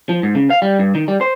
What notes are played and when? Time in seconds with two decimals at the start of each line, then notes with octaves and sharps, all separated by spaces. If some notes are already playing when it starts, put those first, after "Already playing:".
0.09 F3
0.23 G#2
0.35 C#3
0.50 F5
0.62 G3
0.79 G2
0.95 D#3
1.08 G3
1.21 C5